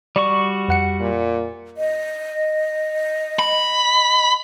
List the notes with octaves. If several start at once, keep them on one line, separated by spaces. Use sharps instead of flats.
G3 F#4 D5 C#6
F2 F#5 C#7
A#2
D#5
B5